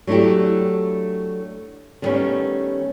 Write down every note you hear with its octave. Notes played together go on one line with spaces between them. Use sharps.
F#3 A3 D4 E4 G4
D3 D#3 G3 A3 B3 C#4